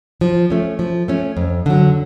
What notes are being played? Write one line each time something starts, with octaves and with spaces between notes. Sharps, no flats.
F3
A3 C#4
F3
A3 C#4
F2
D3 F#3